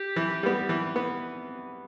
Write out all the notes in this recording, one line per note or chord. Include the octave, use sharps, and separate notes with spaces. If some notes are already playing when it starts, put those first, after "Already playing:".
Already playing: G4
E3
G3 B3
E3
B3